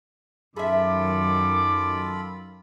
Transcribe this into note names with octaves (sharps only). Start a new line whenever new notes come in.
F#2 D#3 F4 G#4 A4 E5 B5 D6